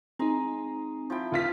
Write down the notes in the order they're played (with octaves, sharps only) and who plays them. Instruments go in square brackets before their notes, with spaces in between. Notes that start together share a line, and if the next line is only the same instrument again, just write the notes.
[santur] G#3 A#5 [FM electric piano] C4 D#4
[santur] F3 E4 G5
[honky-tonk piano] D2 F4 B6